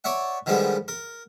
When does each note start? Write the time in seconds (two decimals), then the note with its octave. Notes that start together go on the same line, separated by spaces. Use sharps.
0.04 C#5 D5 E5 F#5
0.46 D3 D#3 F3 G3 G#3 B3
0.88 A#4